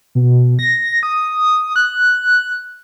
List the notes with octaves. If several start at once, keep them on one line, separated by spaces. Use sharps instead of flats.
B2
A#6
D#6
F#6